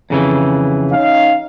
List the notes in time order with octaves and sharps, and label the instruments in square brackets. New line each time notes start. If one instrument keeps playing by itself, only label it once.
[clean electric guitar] F2 C#3 E3
[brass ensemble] C#4 D#4 F5